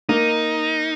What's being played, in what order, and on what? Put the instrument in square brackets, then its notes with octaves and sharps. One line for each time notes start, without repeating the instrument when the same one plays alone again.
[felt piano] A#3 [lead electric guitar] D#4